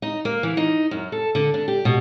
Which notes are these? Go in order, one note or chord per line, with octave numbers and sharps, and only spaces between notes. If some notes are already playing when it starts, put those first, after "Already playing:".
D#4
A#3
E3
D#4
F#2
A4
D3
D4
G4
B2